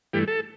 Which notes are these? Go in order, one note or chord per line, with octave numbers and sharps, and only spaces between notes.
G2 E3 A3 G4
A4